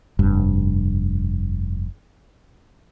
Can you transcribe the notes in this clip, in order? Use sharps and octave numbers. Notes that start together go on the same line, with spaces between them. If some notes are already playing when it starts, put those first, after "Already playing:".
F1 G2